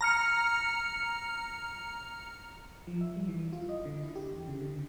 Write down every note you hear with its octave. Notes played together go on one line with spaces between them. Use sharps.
A#5 F6 C#7
F3
E5
G3
E3
F4
D#5
D3
E4
G4
E2
C#3
D3